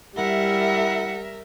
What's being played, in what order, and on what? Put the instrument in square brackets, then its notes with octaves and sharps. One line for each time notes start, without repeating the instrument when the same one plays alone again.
[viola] G3 [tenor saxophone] E4 [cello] A#4 E5 [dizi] F#5